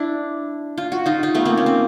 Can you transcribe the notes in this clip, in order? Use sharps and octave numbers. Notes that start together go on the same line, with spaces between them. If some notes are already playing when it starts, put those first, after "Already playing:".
Already playing: D4 E4
F4
F#4
D#4 F4
D#4 F4
A3 B3
A#3 C4
C#4
C4